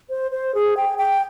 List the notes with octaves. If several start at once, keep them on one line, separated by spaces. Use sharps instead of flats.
C5
C5
G#4
G5
G5